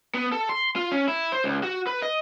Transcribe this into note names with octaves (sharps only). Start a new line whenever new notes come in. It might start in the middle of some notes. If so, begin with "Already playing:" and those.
B3
A4
C6
F4
C#4
E4
C5
C#2
F#4
B4
D#5